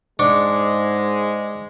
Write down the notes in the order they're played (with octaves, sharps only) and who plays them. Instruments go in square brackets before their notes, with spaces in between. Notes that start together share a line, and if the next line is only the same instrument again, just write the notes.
[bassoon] G#2 [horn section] G#3 [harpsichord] D4 C#6